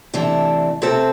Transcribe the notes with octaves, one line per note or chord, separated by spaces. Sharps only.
C3 E3 A3 D4 A4
C3 A3 C4 A4